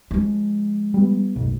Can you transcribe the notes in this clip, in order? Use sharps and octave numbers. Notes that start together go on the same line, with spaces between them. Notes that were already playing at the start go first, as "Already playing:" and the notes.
F3 G#3
G3 B3
F#1 B1